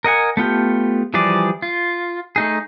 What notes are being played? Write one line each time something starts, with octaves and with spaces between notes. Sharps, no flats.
A#4 D#5 F#5 G#5
A3 B3 F4 G4
E3 F3 G3 G#4 D5
F4
A3 D#4 G#4